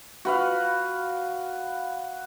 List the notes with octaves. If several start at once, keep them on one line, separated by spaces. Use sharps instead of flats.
F#4 B4 F5